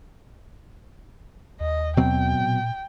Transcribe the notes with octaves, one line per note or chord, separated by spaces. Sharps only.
D#2 D#5
B2 F#3 C4 G5
A#2